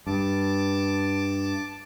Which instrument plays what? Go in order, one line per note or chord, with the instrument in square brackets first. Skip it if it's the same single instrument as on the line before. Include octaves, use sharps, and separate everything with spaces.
[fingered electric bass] G2 [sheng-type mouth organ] A5 D6